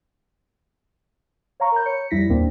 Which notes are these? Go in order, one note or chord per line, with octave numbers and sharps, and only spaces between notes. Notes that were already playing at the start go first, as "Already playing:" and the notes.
C#5 F5 A#5 C#6
A#4 A#5 B5 G6
C#5 C#7
F2 G3 E4 A#6 B6
D#2 A2 A#3 C4 D4